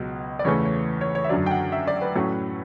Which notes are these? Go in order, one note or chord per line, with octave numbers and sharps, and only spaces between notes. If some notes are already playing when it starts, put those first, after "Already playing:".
Already playing: C#2 B2 F#3
D5
E2 C#3 E3 A3 C#4 C#5
C#5
C#5
C#5
E5
F#2 D3 F#3 D5
G5
F#5
E5
D5
B4
A2 F#3 A3 C#4